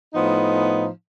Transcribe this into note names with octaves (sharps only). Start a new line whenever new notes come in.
A2 F3 B3 D#4